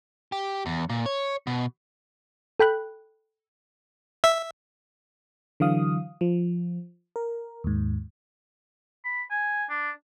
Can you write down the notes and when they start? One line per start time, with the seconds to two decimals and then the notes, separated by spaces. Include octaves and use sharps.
0.32 G4
0.66 E2
0.90 A#2
1.06 C#5
1.47 B2
2.60 A4 G5 B5 F#6
4.24 E5
5.60 D3 E3 F#3 F5 D#6
6.21 F3
7.16 A#4
7.64 D#2 G#2
9.04 B5
9.31 G#5
9.70 D4